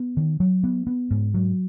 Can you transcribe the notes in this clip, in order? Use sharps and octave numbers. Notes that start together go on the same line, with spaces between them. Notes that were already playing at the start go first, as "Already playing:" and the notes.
Already playing: B3
D#3
F#3
B3
B3
G#2
F#3